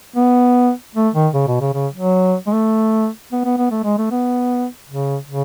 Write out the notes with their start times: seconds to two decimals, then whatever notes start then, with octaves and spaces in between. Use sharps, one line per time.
0.16 B3
0.95 A3
1.14 D#3
1.34 C#3
1.47 B2
1.61 C#3
1.74 C#3
1.94 F#3
2.47 G#3
2.53 A3
3.32 B3
3.45 B3
3.58 B3
3.71 A3
3.84 G#3
3.98 A3
4.11 B3
4.89 C#3
5.29 C#3